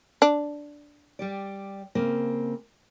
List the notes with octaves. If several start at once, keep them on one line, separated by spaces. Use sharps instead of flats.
D4
G3 G4 D5
C#3 A#3 C4